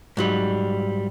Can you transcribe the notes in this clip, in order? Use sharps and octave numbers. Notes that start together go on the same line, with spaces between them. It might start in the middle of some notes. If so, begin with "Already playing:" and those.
G#2 F#3 G3